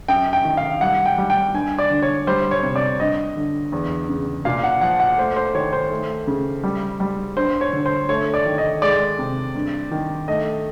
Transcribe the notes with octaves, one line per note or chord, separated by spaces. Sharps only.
F#2 G5
G5
D#3
F5
G3 F#5
G5
G3
G5
G2 G#5
D5
D3
C#5
G3 C5
C#5
C3
D5
G2 D#5
D3
E2
C#3
A#2 F5
F#5
F3 F#5
F#5
A3 C5
C5
D#3 C#5
C5
A3
C#3
G3
G3
G2 C5
C#5
D3
C5
A3 C#5
D5
D#3
D#5
G#3 D5
C3
G2
D#3
A3 D#5